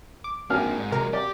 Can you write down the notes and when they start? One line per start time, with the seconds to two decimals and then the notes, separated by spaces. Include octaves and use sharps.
0.24 D6
0.50 G#1 A#3 D4 F6
0.77 G#2
0.91 C3 F#3 G#3 A#4
1.13 G4 D5 D6